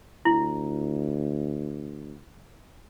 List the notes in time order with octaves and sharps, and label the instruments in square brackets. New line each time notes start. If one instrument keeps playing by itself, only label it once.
[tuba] D2 [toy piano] E4